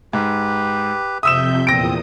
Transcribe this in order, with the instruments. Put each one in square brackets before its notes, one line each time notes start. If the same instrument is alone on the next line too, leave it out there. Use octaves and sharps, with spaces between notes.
[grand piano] G#2 [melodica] G4 B4
[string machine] F2 C3 G6 [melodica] E5 [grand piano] D#6 E6 E7
[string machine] E2 A#2 D#6 [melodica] C4 [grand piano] A#6 D7